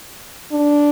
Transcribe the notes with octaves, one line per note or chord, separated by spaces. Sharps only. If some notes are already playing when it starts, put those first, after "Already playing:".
D4